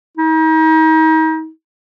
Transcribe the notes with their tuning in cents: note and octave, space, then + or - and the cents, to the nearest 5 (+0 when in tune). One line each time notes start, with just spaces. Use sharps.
D#4 +35